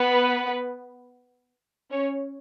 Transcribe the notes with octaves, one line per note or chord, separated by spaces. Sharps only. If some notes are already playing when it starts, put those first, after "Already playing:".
Already playing: B3 B4
C#4 C#5